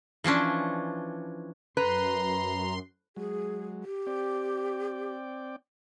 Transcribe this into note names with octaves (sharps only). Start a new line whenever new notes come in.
E3 F3 C#4 D4
F#2 B4 A#5 C6
F#3 G#3 G#4
G4
C4 D5 G5